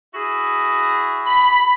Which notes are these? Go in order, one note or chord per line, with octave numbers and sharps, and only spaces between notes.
E4 F#4 G#4
B5